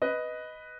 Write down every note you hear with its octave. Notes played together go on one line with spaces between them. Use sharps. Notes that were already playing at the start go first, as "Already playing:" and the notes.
B4 D#5